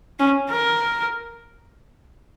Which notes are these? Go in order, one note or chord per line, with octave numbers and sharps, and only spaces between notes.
C#4
A#4